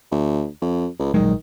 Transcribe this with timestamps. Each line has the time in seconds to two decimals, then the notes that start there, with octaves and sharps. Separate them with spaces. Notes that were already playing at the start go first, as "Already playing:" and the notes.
0.12 D2
0.62 F2
1.00 C#2
1.14 A#1 D#3 F#3 G#3